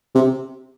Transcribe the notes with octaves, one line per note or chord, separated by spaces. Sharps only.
C3